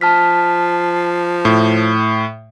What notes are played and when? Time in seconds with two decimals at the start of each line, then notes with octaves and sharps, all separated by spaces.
0.01 F3 A5 F6 B6
1.45 A2